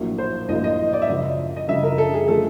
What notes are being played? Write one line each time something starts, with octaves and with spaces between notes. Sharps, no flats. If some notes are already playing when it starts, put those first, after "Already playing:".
Already playing: A#1 A2 F#3 A#3
C5
A#1 A2 F#3 A#3 D#5
D#5
D5
E5
F#2 C#3 F3 D#5
D#5
F#2 C#3 F3 E5
A#4
A4
G#4
D3 F3 A3 A4